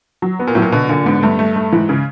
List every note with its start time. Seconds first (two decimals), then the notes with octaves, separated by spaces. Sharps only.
0.22 F#3
0.39 B3
0.47 A#2
0.55 A2 F#3
0.62 A#2
0.72 B2 D3
0.89 A#2 D3
1.06 G#2 B3
1.23 G2 A3
1.39 A3
1.56 A3
1.72 G#2 E3
1.89 C#3